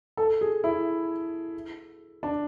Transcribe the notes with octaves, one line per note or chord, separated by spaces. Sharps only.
A4
G#4
E4
D4